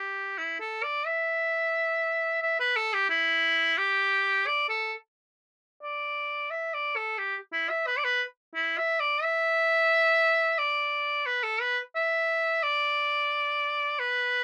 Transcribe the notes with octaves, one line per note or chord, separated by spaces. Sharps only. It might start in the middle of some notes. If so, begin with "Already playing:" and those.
Already playing: G4
E4
A4
D5
E5
E5
B4
A4
G4
E4
G4
D5
A4
D5
E5
D5
A4
G4
E4
E5
B4
D5
B4
E4
E5
D5
E5
D5
B4
A4
B4
E5
D5
B4